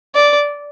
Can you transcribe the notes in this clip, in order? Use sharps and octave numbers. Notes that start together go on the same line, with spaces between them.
D5